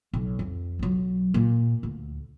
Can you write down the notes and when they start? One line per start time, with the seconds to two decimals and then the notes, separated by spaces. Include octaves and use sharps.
0.14 B1
0.39 F2
0.79 B1 F#3
1.34 A#2
1.83 D2